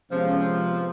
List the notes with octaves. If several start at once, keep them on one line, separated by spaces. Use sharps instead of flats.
C3 F3 G#3 B3 C#4